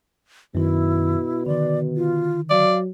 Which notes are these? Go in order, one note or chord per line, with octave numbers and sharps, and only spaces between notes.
F#2 B2 D#3 E4
D3 D#3 D5
F4
F#3 D5 F5